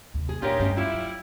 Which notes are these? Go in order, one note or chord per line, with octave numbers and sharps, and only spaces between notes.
D#2 C3
G#4
A#2 G#3 D4 F4 G4 A#4 C#5
D2 G2 B2 C#4
G3 E4 F4
F#3